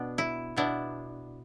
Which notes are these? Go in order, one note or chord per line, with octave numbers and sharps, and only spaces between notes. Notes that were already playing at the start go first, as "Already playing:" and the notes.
Already playing: B2 B3 D4
E4
B2 B3 D4 E4